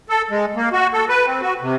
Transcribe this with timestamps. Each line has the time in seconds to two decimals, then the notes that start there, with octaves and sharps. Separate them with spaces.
0.09 A4
0.30 G#3
0.56 A#3
0.73 F#4
0.93 A4
1.09 B4
1.26 C4
1.42 F#4
1.61 C3